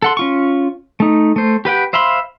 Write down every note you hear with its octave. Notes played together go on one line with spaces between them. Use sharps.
A4 F#5 C6
C#4 F4 C#6
A3 D#4
A3 C5
G4 B4 F#5 G5
C5 E5 F5 B5 C6